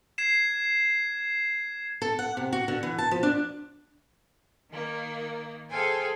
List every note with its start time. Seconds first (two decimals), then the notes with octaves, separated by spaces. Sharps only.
0.18 G#6 C7 E7
2.02 A4
2.19 F#5
2.37 C3
2.53 F#4
2.68 D3
2.83 E3
2.98 A5
3.11 F3
3.23 D4
4.71 D#3 A#3
5.70 G#4 A4 C5 F5 G5 G#5